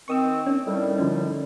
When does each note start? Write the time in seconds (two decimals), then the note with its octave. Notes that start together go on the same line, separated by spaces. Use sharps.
0.08 D#3 C4 C#6 D#6 E6
0.47 C#4
0.66 A2 D#3 G3
0.98 D3 F3 C#4